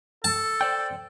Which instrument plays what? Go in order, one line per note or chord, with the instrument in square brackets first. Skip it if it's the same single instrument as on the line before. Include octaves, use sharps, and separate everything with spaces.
[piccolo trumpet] A4 [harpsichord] A5
[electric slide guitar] C5 D5 G5